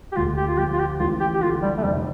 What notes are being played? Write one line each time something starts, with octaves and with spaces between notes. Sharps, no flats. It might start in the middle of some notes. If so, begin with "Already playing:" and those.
G4
D2 F4
G4
F4
F3 G4
F4
G4
A1 F4
G4
G4
D3 F4
G3
A3
F1 G3